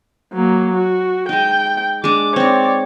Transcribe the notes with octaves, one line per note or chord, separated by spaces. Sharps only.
F#3 A#3
F#4
G#3 D#4 G5
G#3 D4 D6
C4 D#4 C#5 D5